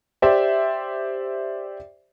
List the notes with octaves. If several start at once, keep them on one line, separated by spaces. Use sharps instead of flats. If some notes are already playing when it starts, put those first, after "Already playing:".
G4 C5 D5 E5